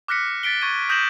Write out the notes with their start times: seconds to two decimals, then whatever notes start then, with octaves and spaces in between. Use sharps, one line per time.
0.08 D6 F6 F#6 A#6 B6 C#7
0.43 A6 B6 D7 G7
0.62 C#6 G#6 A6 D#7
0.89 D#6 G6 A#6 E7 F#7